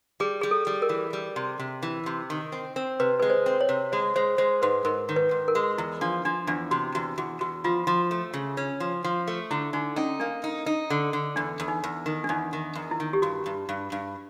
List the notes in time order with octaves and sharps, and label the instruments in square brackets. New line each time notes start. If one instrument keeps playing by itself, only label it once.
[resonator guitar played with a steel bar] G3 [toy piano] G#4
[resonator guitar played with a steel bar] G3 [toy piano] G#4
[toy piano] A4
[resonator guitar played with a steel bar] G3
[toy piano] A#4
[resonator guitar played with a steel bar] E3
G3
C3
C3
E3
C3
D#3
C4
C4
[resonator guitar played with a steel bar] C3 [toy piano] B4
[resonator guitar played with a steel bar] G#3 [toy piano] B4
[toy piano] C5
[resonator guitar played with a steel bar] C4
[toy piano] C#5
[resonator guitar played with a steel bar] C3
[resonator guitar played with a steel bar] G#3 [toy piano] C5
[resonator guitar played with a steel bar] G#3 [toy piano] C5
[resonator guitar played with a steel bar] G#3 [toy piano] C5
[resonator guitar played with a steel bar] G#2 [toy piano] B4
[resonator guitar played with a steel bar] G#2 [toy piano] A#4
[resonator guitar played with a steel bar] D#3
[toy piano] B4
[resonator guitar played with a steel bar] G#2
[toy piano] A#4
[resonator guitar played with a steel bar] G#3
[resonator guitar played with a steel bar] E2 [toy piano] E4
[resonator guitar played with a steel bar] F3 [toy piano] D4
[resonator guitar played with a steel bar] F3 [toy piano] D4
[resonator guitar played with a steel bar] E2 [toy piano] D4
[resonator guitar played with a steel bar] C3 [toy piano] F#4
[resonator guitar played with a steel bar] E2 [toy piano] F#4
[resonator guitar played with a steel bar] E2 [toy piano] F#4
[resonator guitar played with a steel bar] E2 [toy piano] F#4
[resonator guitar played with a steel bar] F3 [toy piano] F4
[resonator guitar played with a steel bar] F3
A3
C#3
C#4
F3
F3
A3
[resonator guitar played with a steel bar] D3 [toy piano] E4
[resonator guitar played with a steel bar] D3 [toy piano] D#4
[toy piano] C#4 [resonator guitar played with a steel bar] D#4
[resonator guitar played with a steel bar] A#3 [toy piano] D4
[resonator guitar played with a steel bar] D#4
D#4
D3
D3
[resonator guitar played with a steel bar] E2 [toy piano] D4
[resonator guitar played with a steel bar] E2
[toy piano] D#4
[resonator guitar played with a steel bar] E2
D#3
[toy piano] D4
[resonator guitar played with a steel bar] E2 [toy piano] D#4
[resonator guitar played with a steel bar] D#3
E2
[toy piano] E4
[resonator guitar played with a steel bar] D#3
[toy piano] G4
[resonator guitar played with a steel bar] G2 [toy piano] F#4
[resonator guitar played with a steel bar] G2
G2
G2